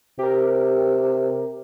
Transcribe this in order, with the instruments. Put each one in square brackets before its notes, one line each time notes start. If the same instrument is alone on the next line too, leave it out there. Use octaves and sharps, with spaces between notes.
[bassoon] C3 [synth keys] G4 A#4